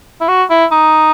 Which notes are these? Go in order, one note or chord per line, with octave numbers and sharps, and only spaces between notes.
E4
F#4
E4
D#4